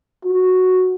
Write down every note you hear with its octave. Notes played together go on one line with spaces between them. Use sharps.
F#4